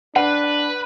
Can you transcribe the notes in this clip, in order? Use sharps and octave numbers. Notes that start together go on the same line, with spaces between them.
D4 B4 F#5